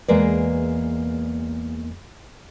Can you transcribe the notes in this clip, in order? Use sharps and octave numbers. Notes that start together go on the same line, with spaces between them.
E2 G#3 A#3 A#4 B4 D5